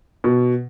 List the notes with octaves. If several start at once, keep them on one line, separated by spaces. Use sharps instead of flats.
B2